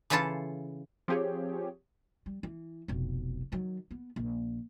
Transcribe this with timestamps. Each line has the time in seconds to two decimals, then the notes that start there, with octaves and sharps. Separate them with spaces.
0.10 C#3 E3 E4 F4 A4 A5
1.08 F3 C4 G4 G#4 C#5
2.26 G3
2.43 E3
2.88 F1 B1
3.52 D#3 F#3
3.91 B3
4.16 A#1